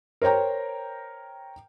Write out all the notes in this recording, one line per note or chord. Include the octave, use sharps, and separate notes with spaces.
A#4 C5 C#5 G5 A#5